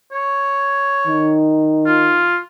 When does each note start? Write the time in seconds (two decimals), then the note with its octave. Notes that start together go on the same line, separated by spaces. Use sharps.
0.12 C#5
1.07 D#3
1.86 F4